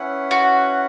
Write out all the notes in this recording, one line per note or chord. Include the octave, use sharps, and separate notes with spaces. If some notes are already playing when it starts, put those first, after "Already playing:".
Already playing: C#4 E4 B4 F#5
F#4